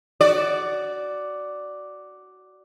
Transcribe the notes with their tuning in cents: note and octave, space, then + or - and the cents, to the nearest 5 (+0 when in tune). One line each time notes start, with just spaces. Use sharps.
F#4 +15 D5 +0